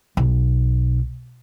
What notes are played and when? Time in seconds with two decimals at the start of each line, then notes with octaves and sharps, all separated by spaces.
0.17 B1